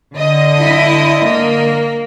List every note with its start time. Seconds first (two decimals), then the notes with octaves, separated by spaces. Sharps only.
0.15 D3 D#5
0.59 E4
1.26 A#3